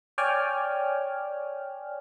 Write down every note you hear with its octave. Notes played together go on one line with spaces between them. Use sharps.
C#5 D5 G5 G#5 F6